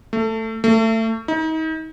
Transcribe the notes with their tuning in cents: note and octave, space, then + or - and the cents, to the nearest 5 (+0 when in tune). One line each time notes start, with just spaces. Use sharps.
A3 +15
A3 +25
D#4 +35